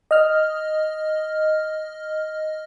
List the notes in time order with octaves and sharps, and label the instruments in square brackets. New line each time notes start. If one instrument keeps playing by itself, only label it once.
[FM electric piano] D#5 F6